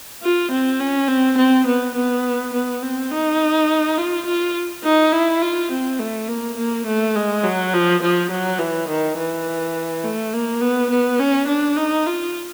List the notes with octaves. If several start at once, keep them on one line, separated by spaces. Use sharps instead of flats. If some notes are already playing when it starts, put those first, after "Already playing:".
F4
C4
C#4
C4
C4
B3
B3
B3
C4
D#4
F4
F4
D#4
E4
F4
C4
A3
A#3
A#3
A3
G#3
F#3
F3
F3
F#3
E3
D#3
E3
A3
A#3
B3
B3
C#4
D4
D#4
F4